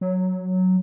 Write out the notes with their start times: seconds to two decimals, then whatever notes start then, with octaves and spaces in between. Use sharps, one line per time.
0.01 F#3